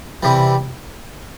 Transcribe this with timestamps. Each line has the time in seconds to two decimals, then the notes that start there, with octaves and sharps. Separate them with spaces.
0.23 C3 E3 G3